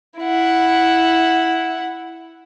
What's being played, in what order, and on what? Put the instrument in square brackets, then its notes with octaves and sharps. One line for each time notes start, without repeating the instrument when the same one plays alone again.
[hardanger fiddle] E4 F#5